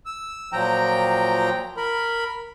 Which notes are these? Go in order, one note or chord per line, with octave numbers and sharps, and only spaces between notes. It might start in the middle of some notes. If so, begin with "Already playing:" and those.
E6
A#2 F3 F#3 G5 A#5
A#4 B5